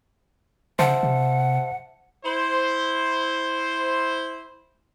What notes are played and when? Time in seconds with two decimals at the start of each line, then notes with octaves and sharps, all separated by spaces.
0.79 C#3 C5 E5 F#5 A5
1.03 C3
2.25 E4 C5